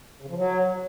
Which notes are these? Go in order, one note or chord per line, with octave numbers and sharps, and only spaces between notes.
C#3
F3
F#3